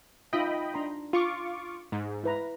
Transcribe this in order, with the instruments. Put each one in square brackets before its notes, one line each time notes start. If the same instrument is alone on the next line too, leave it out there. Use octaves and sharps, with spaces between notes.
[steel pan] D#4 F4 E5 [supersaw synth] D#5 G5 B5
[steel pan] D4 A#5 C6
[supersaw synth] F4 C#6 D6
G#2
[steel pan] E4 B4 A#5